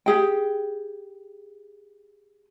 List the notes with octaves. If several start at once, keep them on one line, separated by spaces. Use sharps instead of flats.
G4 G#4 G5